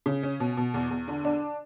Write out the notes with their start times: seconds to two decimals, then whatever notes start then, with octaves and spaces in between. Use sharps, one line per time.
0.06 C#3
0.23 C#4
0.40 B2
0.57 B2
0.74 E2
0.91 E2
1.08 D3
1.25 D4